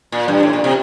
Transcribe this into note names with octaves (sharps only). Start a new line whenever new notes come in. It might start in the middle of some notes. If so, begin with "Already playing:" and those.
A#2
G2
A2
A#2
C3